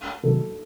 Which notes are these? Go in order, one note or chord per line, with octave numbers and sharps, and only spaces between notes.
C3 D#3 F#3 A4